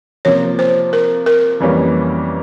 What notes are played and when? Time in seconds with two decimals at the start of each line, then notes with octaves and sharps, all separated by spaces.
0.25 C3 F3 A#3 C#5
0.59 C5
0.93 A#4
1.26 A#4
1.60 F2 E3 G3 A#3 C#4